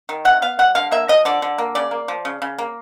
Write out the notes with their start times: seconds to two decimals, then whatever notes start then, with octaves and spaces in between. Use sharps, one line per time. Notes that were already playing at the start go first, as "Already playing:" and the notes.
0.09 D#3
0.25 C3 F#5
0.42 B3 F5
0.59 G3 F#5
0.75 D3 F5
0.91 A#3 E5
1.08 F3 D#5
1.25 D3 D5
1.42 D3
1.58 A#3
1.75 C#3 D5
1.91 A#3
2.08 F3
2.25 C#3
2.42 C#3
2.58 A#3